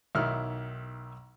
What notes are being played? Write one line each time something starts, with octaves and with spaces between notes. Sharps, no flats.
B1 D#3 E4 F6